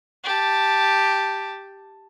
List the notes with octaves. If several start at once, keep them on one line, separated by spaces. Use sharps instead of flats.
G4 A5